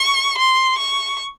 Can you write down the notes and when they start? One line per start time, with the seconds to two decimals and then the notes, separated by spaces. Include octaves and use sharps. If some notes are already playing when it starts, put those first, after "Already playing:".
Already playing: C#6
0.38 C6
0.78 C#6